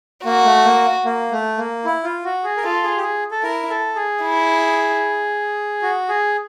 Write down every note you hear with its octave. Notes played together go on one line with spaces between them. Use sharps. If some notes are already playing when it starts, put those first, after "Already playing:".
A#3 F#4
A3
A#3
A#3
A3
A#3
E4
F4
F#4
G#4
A#4
F4 A4
G#4
G4
G#4
A4
E4 A#4
A4
G#4
E4
F#4
G#4